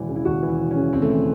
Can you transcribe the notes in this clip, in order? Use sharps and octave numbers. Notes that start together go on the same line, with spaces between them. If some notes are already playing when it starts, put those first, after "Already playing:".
Already playing: E1 D#2 E3 E4
C#3
E4
D#2 F#4
E3
E4
E1
C#4
C#3
D#2 C4
A3
E3 C4